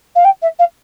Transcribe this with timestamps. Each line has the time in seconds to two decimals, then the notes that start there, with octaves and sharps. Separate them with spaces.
0.15 F5
0.25 G5
0.42 E5
0.59 F5